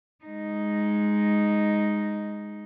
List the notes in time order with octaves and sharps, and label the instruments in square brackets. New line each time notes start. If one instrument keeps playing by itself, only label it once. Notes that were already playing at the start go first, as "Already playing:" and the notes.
[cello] G#3 D#4